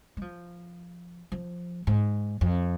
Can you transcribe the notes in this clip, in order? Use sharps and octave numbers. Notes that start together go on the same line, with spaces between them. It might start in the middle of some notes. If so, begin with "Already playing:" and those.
G#3
F3
F3
G#2
F2